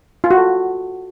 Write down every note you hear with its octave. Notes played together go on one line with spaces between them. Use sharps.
F4
F#4
A4